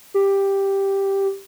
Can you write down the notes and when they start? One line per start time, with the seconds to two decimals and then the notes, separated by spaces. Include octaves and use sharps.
0.14 G4